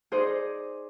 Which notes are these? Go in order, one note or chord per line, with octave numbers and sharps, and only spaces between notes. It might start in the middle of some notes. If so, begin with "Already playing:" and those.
D#4 G#4 C5 D5 D#5 G#5